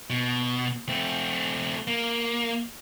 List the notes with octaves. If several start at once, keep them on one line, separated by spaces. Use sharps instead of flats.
B2
A3 C4
A#3